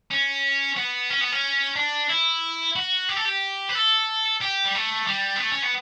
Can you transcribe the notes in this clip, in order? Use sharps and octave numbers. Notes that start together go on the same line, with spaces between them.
C#4
B3
C#4
B3
C#4
D4
E4
F#4
G4
A4
G4
B4
A4
G4
G3
A3
G3
B3
A3
C#4
B3